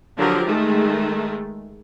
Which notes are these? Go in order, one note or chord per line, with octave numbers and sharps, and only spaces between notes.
D3 F3 F#3 G4 A#4
D#3 G#3 A3